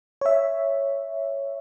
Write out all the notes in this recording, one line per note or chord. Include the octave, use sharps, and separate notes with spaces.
C#5 E5